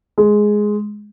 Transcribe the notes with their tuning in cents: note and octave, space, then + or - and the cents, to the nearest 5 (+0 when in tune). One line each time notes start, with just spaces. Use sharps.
G#3 +5